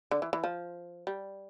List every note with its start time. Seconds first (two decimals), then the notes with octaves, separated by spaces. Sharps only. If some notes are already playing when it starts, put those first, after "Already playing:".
0.11 D3
0.22 E3
0.33 E3
0.44 F3
1.07 G3